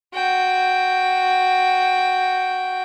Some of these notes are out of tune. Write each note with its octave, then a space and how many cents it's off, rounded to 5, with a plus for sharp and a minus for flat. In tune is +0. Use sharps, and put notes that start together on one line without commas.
F#4 +0 G5 +0